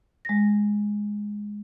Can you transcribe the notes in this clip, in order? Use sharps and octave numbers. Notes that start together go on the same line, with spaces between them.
G#3 A#6